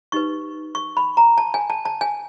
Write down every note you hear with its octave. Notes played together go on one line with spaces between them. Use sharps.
D#4 G4 B4 C#6
C#6
B5
A#5
A5
G#5
A5
A5
G#5